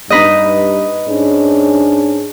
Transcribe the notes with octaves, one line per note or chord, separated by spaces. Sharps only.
G2 D#4 B4 D#5
G#2 C#4 D4